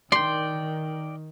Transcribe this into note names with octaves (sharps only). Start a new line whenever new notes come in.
D#3 D5 G5 C6